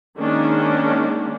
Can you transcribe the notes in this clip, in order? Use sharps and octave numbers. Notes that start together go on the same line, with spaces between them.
D#3 G#3 A#3 C#4 D4